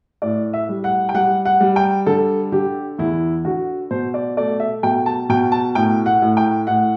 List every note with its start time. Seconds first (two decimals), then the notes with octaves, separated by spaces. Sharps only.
0.22 A2 D5
0.54 E5
0.69 G3
0.84 F#5
1.09 G5
1.15 G3 F#5
1.45 F#5
1.61 G3
1.76 G5
2.06 D3 A4
2.52 D3 G4
2.98 E2 E4
3.45 D3 F#4
3.91 B2 C5
4.14 D5
4.37 A3 D5
4.60 E5
4.83 B2 G5
5.06 A5
5.29 B2 G5
5.52 A5
5.75 A2 G5
6.06 F#5
6.22 A2
6.37 G5
6.67 A2 F#5